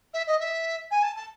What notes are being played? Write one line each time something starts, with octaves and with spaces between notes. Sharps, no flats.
E5
D#5
E5
G#5
A5
A5